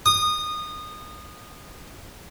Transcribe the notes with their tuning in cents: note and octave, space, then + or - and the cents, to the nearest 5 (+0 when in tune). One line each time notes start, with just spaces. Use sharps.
D#6 -20